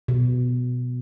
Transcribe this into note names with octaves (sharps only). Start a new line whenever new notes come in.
B2